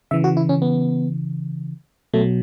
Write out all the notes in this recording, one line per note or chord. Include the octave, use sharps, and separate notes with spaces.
C#3 E3 E5
F#4
E4
C#4
B3
B2 F#3 A3